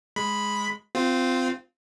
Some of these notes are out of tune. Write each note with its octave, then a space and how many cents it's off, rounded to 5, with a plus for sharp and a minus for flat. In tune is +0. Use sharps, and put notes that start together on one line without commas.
G#3 +0 B5 +0
C4 -20 F4 +0